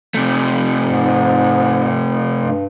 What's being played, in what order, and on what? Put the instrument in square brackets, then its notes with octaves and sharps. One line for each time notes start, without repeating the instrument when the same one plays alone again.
[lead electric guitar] C3 A3
[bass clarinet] G#2
G2